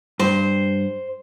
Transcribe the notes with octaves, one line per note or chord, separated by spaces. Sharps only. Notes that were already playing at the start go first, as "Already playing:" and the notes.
G2 C5